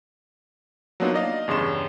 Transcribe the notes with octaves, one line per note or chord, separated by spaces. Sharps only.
F#3 A#3 B3 D4 D#4 F4
D5 D#5 F5
E2 G2 C#3 C6 E7